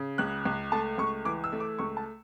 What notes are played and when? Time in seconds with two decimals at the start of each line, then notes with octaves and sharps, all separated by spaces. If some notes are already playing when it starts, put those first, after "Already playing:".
Already playing: C#3
0.18 C#2 F#6
0.45 C#2
0.72 A3 A5
0.98 C#2 C#6
1.25 E3 D6
1.44 E6
1.52 A3
1.60 D6
1.79 C#2 C#6
1.97 A5